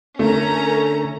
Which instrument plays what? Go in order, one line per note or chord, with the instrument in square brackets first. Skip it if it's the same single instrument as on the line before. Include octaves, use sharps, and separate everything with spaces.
[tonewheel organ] D3 [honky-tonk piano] A3 [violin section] C#4 A#5 [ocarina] A#4